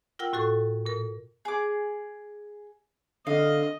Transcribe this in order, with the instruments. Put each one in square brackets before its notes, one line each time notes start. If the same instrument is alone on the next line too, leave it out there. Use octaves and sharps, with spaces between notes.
[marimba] F4 A#4 F#5 G5 E6
A2 F#4 A4 C#6
A#2 A#4
[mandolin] G#4 D6
[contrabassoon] D3 [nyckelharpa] D#5 [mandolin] F5